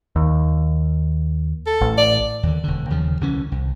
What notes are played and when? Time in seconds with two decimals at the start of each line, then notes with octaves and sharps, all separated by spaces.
0.16 D#2
1.66 A4
1.81 A1
1.98 D5
2.43 D#2 D3
2.64 E1 D3
2.90 D#2 C#3 F3
3.21 C2 D3 E3 C#4
3.52 C2